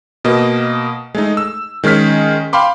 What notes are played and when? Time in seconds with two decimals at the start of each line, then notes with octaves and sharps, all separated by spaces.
0.25 B2 A#3 D#5
1.15 G#3 A3 D#4
1.37 E6
1.83 D#3 G#3 C#4 F6 B6
2.53 F5 G5 B5 C6 D6